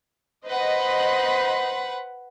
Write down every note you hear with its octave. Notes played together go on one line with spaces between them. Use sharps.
B4 C5 D#5 F#5 B5